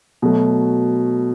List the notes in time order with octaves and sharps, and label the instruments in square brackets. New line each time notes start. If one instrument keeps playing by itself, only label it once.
[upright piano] B2 F#3 A3